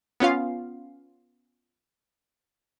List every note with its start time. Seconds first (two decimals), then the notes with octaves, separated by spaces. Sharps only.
0.20 B3 C#4 F4 F5